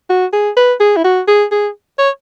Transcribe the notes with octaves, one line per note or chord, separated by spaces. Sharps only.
F#4
G#4
B4
G#4
E4
F#4
G#4
G#4
C#5